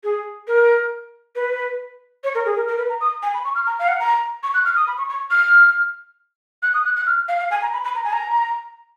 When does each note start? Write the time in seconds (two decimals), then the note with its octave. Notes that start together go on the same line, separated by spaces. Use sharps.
0.04 G#4
0.47 A#4
1.35 B4
2.24 C#5
2.35 A#4
2.46 G#4
2.56 A#4
2.68 A#4
2.78 B4
2.89 A#5
3.01 D#6
3.23 G#5
3.34 B5
3.45 C#6
3.55 F6
3.67 A#5
3.79 F5
3.88 F#5
3.99 A#5
4.43 C#6
4.54 F#6
4.65 F6
4.76 D#6
4.87 B5
4.98 C#6
5.09 C#6
5.31 F6
6.63 F#6
6.74 D#6
6.85 F#6
6.96 F#6
7.06 F6
7.28 F5
7.39 F5
7.51 G#5
7.62 A#5
7.73 B5
7.84 B5
7.95 A#5
8.04 G#5
8.13 A#5